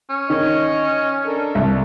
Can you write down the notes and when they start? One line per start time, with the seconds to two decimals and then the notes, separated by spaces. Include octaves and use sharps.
0.10 C#4
0.30 D#3 C#5 D#5
1.26 D4 A4 A#4
1.55 C2